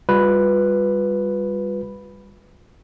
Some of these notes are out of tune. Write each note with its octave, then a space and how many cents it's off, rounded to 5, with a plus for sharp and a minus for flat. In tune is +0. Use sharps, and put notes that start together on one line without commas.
G3 +20 F4 +35 B4 +0